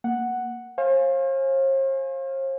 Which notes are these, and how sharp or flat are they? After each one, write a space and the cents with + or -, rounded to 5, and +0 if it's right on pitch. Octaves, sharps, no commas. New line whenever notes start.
A#3 +0 F#5 +0
C5 +45 F5 +0 G#5 +0